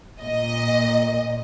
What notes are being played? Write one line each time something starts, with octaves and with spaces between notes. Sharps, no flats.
A#2 D#5